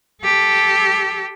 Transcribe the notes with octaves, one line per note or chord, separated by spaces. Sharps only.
G4 A4